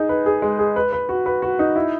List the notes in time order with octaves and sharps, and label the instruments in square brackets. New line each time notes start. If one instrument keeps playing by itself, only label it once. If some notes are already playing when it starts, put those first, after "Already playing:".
Already playing: [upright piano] D#4 G#4
B4
G#4
G#3
G#4
B4
B4
F#4
B4
F#4
D#4
E4